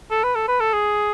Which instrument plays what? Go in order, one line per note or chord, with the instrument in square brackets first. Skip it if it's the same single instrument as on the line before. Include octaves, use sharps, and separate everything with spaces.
[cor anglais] A4
B4
A4
B4
A4
G#4